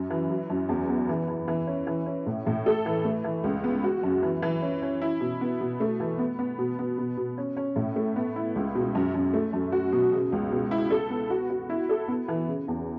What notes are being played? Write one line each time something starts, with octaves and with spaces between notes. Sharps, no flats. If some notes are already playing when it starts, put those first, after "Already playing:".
Already playing: F#2
E3
F#3
F#2
E2
B3
E3
E3
E3
C#4
E3
C#4
A2
A2
A4
E3
A3
E3
C#2
B3
F#4
F#2
E3
E3
C#4
C#4
E4
B2
B3
B2
A3
E3
B3
B3
B2
B3
B2
B2
C#4
C#4
A2
A3
B3
E4
C#2
B2
F#2
F#2
A3
F#2
F#4
B2
C#3
C#2
B2
E4
A4
B3
F#4
F#4
E4
A4
B3
E3
C#3
E2